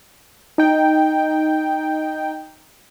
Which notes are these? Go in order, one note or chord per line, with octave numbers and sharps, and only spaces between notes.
D#4 G5